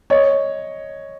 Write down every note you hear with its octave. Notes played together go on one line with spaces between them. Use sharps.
C#5 D#5